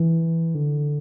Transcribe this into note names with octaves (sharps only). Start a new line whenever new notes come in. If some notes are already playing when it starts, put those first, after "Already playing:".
Already playing: E3
D3